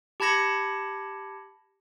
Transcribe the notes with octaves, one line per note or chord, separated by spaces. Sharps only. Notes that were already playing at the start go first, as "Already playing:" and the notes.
G4 A5 B5 G#6 A#6 C#7